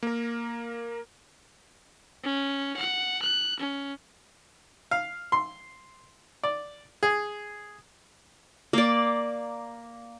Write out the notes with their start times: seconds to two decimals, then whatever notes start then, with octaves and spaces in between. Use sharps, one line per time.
0.03 A#3 A#4
2.23 C#4
2.77 F#5
3.22 F#6
3.60 C#4
4.91 F5
5.32 C6
6.44 D5
7.03 G#4
8.73 A#3 D5